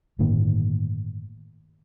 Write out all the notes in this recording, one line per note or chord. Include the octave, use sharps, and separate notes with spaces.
G1 A2 D#3 A#3